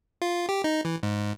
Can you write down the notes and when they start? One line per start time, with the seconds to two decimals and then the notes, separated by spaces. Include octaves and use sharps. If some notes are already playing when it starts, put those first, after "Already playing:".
0.22 F4
0.49 G4
0.64 D#4
0.85 E3
1.03 G#2